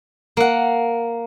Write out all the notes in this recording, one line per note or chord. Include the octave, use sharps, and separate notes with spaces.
A#3 F#5